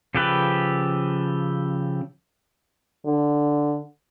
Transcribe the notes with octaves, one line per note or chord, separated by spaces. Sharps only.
C#3 F3 G4 A4 B4
D3